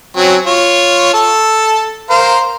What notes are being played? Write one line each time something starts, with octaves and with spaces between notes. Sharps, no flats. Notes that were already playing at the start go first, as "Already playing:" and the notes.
F#3 C4 C#4
F4 C#5
A4 A5
A#4 C5 F5